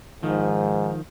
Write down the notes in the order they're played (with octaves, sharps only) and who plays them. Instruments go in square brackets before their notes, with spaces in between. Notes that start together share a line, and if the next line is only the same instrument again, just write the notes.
[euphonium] G#2 [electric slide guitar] D#3 F3